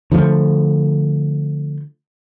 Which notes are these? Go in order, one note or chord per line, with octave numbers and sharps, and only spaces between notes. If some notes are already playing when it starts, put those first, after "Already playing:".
D3 F3 A3